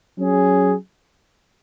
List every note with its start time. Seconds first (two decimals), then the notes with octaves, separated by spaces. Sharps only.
0.17 F#3 C#4 G#4